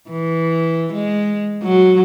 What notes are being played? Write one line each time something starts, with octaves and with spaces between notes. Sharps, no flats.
E3
G#3
F#3